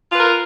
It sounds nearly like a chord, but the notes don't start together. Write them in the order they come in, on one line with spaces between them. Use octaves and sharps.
F4 B4 A#4